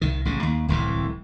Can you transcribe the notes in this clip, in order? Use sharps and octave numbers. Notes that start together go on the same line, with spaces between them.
C2 D#3
A1 C#3
D#2
D1 C2 A2 E3